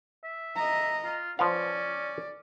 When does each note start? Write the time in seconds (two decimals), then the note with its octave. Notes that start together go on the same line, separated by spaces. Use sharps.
0.24 E5
0.56 D#5 A#5
1.04 F4
1.39 F3 C#4 B4 D5 F5